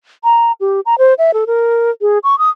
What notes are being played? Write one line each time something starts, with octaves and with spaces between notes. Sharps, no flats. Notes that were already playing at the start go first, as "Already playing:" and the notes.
A#5
G4
A#5
C5
E5
A4
A#4
G#4
C#6
D#6